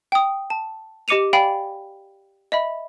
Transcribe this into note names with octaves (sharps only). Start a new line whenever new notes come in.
G5 D#6
A5
G4 D#5 D6 C#7 D#7 F7
D5 F5 G5 G#5 B5
D#5 E5 B5